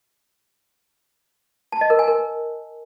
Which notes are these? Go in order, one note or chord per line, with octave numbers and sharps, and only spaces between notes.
A5
D#5
A#4
G#5
A#4